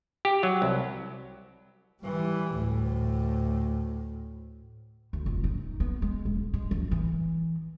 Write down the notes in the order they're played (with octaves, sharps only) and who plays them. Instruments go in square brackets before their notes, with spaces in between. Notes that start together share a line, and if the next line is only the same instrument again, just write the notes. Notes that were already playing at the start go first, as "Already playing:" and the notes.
[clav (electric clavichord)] G4
F#3
C2
[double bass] E3 G3
D2 A2
[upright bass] D2
F1
D#4
B3
G#3
D#1
G#3
F3
E3